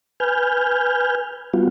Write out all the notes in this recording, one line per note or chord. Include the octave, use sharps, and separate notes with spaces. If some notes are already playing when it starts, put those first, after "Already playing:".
B4 G#5 F6 G6
G3 B3 F4 F#4